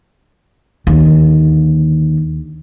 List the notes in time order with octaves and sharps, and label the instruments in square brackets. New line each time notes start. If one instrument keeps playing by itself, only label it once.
[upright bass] D#2 D3